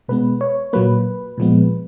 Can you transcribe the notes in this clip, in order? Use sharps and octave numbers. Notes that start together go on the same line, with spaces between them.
B2 G#3 B3 B4
C#5
A#2 F#3 A#3 B4
A#2 F3 G#3 B3